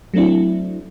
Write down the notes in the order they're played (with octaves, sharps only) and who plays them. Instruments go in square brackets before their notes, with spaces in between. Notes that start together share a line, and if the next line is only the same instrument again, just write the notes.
[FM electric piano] F#3 A3 C4 D4 E4